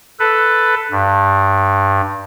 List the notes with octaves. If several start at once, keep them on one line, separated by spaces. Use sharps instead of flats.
A4 B4
G2